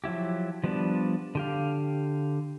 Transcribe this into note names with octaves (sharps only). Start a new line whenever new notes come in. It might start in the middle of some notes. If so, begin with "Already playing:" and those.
F3 F#3 E4 G4
F3 G3 B3 D4
D3 G4 F5